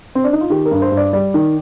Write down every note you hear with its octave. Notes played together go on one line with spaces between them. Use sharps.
C4
D4
D#4
F4
D#3 G4
A#4
G2
C5
G2
D5
G3 D5
D#3